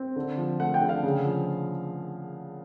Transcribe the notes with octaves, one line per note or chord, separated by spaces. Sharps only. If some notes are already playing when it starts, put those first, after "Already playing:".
Already playing: C4
D3
F3
A3 F#5
G5
D3
F5
C#3
F3